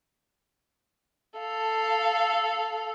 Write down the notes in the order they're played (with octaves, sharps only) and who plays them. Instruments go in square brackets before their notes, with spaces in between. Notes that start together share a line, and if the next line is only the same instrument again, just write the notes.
[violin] A4 F5